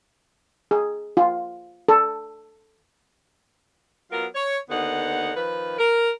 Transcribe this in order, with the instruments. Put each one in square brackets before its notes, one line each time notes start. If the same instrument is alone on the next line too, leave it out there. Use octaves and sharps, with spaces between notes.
[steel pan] G#4
F4
A4
[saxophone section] F#3 B3 F4 A#4
C#5
D#2 D3 B3 D#4 F#5
D#3 F3 B4
A#4